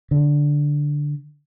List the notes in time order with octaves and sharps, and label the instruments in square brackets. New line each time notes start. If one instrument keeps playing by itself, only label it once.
[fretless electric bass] D3